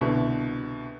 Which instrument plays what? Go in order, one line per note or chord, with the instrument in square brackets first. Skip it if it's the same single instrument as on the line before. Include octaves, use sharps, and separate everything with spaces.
[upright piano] C2 B2 D3